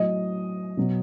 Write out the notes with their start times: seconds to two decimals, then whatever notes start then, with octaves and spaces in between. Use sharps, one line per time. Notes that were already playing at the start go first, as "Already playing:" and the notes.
Already playing: A2 F#3 D#5
0.77 B2 F#3